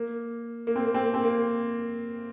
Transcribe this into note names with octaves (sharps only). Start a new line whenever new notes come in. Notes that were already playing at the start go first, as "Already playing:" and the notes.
Already playing: A#3
A#3
C4
A#3
C4
A#3
C4
A#3